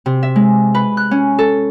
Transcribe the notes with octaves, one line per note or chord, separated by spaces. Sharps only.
C3
E5
G#3
B4
F#6
C#4
A4